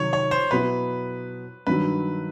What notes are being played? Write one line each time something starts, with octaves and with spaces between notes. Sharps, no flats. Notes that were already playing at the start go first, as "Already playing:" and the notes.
Already playing: C3 D#3 F#3 C#5
C#5
C5
B2 F#3 B3 E4 B4
G2 D#3 F#3 B4